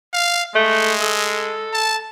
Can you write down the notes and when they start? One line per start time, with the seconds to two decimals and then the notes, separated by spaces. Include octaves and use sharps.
0.13 F5
0.55 G#3 A3
1.00 A4
1.73 A5